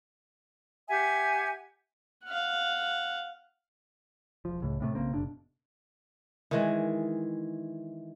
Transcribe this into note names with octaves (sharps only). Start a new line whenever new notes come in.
G4 E5 F#5 G#5
F5 F#5
E1 F3
C#2 A2
A2 C3 A3
B1 C#3 A#3 C4
F#1 B2 D4
D#3 E3 G#3